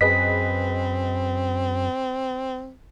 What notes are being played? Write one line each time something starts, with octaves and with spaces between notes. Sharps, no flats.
F#2 C4 G#4 B4 D#5 B6